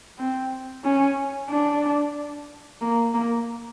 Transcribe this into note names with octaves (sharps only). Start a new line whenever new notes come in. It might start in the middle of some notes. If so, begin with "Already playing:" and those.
C4
C#4
D4
A#3
A#3